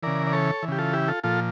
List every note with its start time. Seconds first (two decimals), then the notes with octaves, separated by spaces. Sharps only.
0.03 C#3 E3 A#4 D5
0.27 D5
0.33 A4 C#5
0.63 E3
0.68 C#3 G4
0.79 F4 A4
0.93 E4 G4
1.08 F4 A4
1.24 A#2 F3 F4 A4